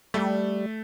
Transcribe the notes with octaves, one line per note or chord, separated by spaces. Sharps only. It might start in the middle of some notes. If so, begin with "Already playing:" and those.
G3 A3